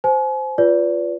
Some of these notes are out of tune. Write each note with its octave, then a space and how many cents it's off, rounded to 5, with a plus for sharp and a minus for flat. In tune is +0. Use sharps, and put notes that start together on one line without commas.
C5 -10 G#5 +40
F4 +0 B4 +5 D5 -30